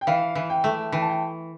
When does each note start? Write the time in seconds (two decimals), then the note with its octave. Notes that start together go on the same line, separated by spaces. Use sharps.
0.01 G5
0.07 E3 F5
0.35 E3
0.50 G5
0.64 A3
0.92 E3 G5
1.01 A5
1.09 G5